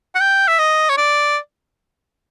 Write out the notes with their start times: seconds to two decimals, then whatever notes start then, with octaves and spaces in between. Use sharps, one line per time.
0.15 F#5
0.20 G5
0.48 E5
0.59 D#5
0.89 C#5
0.97 D5